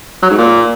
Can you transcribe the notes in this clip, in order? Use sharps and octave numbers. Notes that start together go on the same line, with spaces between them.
F#3
G#2
A#2